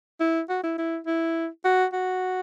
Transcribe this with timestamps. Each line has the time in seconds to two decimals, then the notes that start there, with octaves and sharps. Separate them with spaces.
0.20 E4
0.49 F#4
0.64 E4
0.78 E4
1.06 E4
1.65 F#4
1.93 F#4